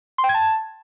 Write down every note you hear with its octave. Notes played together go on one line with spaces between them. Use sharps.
C6
G5
G#6
A5